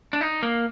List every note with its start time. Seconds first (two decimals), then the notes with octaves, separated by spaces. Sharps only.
0.13 D4
0.21 D#4
0.43 A#3